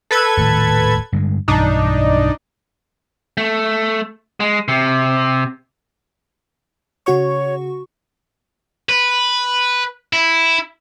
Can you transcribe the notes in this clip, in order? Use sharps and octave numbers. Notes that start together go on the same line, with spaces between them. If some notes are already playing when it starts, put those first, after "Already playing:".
A4 B4 G#6
D#1 A2 D#3
G2 D3 G#3
B1 G2 E3 D4 D#4
A3
G#3
C3
C#3 F#4 C#5 C#6
B4
E4